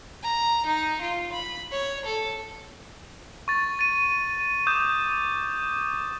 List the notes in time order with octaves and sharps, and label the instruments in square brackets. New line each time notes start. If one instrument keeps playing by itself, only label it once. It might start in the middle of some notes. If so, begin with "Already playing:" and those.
[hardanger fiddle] A#5
D#4
F4
B5
C#5
A4
[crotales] C#6 A6
A6 D#7
D6 D#6 G6 E7